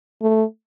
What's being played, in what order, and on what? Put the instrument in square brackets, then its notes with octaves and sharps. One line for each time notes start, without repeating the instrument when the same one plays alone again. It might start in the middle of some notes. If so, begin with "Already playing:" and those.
[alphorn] A3